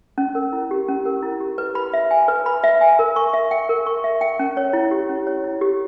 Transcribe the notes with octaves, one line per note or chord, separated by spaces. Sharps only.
C#4
A#4
E4
G4
C#4
A#4
E4
G4
B4
B5
E5
G#5
B4
B5
E5
G#5
A#4
C#6
E5
G5
A#4
C#6
E5
G5
C#4
C#5
E4
G4
C#4
C#5
E4
G4